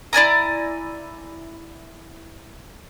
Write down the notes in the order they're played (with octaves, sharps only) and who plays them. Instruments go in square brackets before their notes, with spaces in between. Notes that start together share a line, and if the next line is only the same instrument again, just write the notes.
[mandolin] E4 D5 G#5 A#5